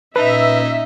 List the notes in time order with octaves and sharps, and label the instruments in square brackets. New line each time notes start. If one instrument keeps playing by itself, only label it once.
[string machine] A#2 C#4 [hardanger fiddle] D#4 [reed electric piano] B4 [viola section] E5